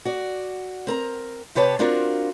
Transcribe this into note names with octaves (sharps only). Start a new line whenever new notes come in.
F#4 D5
C4 A#4 A#5
C3 G4 B4 C#5 A5
C4 D4 F4 F#4 A#4